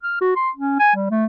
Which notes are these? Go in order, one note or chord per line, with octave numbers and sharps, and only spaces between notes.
F6
F#4
C6
C#4
G#5
G3
A3